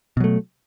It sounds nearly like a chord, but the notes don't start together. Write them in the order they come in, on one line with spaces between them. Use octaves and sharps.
B2 F#3 A3